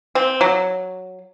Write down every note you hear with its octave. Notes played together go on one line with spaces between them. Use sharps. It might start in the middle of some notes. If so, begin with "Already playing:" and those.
C4
F#3